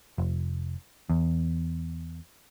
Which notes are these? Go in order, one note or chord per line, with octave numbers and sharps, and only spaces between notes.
F1
E2